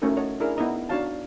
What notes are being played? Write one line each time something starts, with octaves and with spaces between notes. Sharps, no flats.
A3 C#4 D#4 E4 F#4 A#4
C#5 D#5 F#5 A5
D4 E4 G#4 A#4
B3 D#4 E4 D#5 A#5
D4 D#4 F#4 C#5 F5 A5